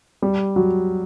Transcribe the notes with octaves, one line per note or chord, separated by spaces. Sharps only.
G3
F#3